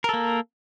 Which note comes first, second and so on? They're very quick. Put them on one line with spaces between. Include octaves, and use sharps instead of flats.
A#4 A4 A#3